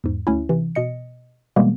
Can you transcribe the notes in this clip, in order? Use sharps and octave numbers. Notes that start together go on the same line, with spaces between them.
E2 G#2
D2 C#4 E4
C3 E3
B2 D#5 C#7
B2 E3 G3 G#3 A#3 B3